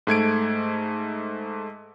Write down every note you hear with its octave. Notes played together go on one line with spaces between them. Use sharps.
G#2 A3 G#6 D7